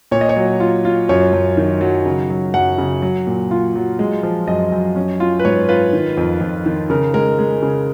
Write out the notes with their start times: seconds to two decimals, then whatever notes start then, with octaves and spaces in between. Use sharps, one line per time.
0.11 A#2 C#5
0.21 D#5
0.29 C#5
0.37 F#3
0.60 F4
0.85 F4
1.09 F#2 C#5
1.33 F#2
1.57 D#3
1.81 F#3
2.06 C#3
2.30 F#3
2.54 F#2 F#5
2.78 C#3
3.02 F#3
3.27 A#2
3.51 F4
3.76 F#3
3.99 G#3
4.23 F3
4.47 F#2 D#5
4.72 F#2
4.96 C#4
5.20 F4
5.39 B4
5.45 G#2 C#5
5.69 F4 B4
5.93 D#3
6.17 F2
6.41 F2
6.66 D#3
6.90 C#3 A#4
7.14 G#3 A#4
7.39 G#3
7.62 C#3